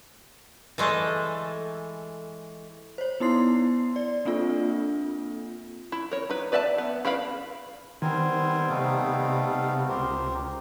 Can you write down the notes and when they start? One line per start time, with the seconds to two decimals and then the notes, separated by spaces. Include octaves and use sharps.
0.78 E3 G#3 A3 G#4 A4
2.98 C5 C#5
3.20 B3 D#4 E4 C6 C7
3.96 D5
4.25 A#3 C4 D4 F4 A4
5.92 E4
6.11 A#4 C#5
6.30 D#4 B4
6.52 B4 D5 E5 G#5 A5
6.78 B3
7.05 E4 A#4 B4 F5 B5
8.02 D#3 G3 B3 C4 A#4 C5 G#5
8.70 C3 A3 D#4 F5
9.89 C#2 G4 A#4 C5